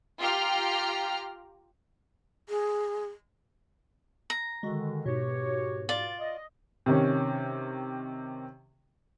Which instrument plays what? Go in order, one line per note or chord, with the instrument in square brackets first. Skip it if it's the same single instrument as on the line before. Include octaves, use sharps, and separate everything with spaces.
[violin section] F4 G4 G5 A#5 F6
[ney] G#4
[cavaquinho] A#5
[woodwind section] D3 D#3 [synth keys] G#3 F#4
[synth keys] G#2 B2 [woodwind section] F#4 G4 C#5
[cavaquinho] F4 D5
[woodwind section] D#5
[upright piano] C3 D#3 C#4